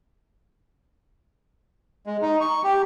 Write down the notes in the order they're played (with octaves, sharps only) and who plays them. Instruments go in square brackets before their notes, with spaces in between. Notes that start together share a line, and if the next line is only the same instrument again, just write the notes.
[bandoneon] G#3
D#4
C#6
G4